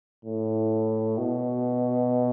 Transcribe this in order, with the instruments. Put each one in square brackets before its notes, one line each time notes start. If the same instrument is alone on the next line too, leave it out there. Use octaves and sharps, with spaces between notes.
[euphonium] A2
B2